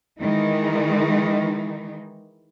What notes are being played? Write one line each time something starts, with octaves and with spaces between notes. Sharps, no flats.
D#3 E3 G#3 D#4